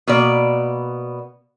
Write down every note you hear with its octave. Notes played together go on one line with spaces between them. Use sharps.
B2 A#3 B3 D5